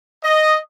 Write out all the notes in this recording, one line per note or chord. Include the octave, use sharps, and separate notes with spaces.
D#5